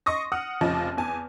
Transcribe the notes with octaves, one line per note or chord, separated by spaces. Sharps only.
D#5 C6 C#6 D#6 A#6
F#5 D#6 F6
F1 C#3 F3 D#5 D6
E2 G#5 A5